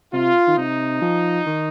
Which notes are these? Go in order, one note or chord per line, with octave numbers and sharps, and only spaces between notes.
C3 F4
D#3
C3 D#4
F3
D#3